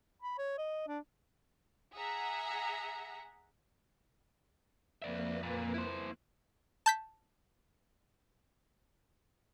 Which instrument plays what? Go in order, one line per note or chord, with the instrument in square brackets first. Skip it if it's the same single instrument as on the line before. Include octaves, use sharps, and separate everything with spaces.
[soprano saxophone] B5
C#5
D#5
D4
[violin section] G#4 E5 F#5 A#5
[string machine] F2 A#3 B4 [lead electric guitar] D5 E5
[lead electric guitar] A#2
E4 C5
[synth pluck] A5 G6 B6